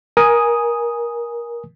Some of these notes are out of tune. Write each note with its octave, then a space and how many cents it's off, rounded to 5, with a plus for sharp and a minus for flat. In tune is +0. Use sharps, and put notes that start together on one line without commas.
A#4 +20 G#5 +0 D#6 +0